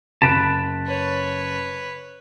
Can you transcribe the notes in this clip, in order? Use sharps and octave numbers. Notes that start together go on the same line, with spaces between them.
F#1 A5 B5 F#6 D7
B4 C#5